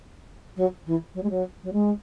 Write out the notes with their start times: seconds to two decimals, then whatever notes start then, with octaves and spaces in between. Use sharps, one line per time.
0.56 F#3
0.86 E3
1.14 F#3
1.23 G#3
1.30 F#3
1.63 F#3
1.72 G#3